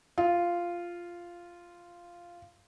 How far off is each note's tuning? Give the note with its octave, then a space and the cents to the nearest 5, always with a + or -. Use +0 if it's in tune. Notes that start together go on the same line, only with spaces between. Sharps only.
F4 -5